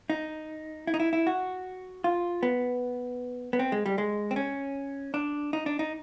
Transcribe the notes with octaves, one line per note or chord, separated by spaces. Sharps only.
D#4
E4
D#4
E4
E4
F#4
F4
B3
B3
C4
G#3
G3
G#3
C4
C#4
D4
D#4
D4
D#4